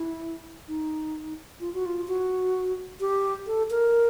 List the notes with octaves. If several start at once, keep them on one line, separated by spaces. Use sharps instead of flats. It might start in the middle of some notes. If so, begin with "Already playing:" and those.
Already playing: E4
D#4
F4
F#4
F4
F#4
G4
A4
A#4